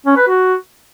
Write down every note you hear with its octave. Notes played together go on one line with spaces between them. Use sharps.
C#4
B4
F#4